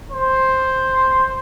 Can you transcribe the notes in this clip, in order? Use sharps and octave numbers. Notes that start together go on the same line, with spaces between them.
C5